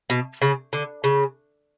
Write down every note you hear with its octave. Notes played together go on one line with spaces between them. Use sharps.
B2
C#3
D3
C#3